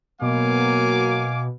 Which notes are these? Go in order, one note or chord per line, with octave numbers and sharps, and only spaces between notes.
B2 F#3 A#3 F5 G#5 D6